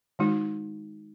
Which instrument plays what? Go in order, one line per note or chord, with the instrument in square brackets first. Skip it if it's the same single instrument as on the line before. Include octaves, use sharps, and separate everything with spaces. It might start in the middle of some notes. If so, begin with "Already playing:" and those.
[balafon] D#3 G#3 D#4 F#4